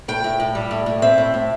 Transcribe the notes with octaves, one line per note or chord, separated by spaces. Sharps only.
A2 G5
A2
A2
G3
A2
A2
C4 E5
A2
A2